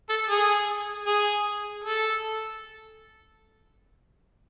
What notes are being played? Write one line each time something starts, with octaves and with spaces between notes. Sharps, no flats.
A4
G#4
G#4
A4